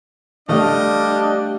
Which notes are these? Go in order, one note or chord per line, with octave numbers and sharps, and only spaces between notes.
G3 A3 D4 D#5 F5